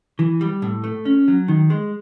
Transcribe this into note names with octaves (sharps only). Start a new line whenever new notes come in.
E3
G3
A2
A3
C#4
F#3
D#3
G#3